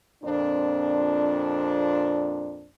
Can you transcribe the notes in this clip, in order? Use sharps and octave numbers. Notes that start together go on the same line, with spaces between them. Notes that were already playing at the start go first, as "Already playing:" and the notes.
F2 A#2 C4 D4